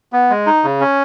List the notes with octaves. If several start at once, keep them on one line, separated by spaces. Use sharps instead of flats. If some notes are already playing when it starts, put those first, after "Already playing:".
B3
G#3
D#4
C#3
C#4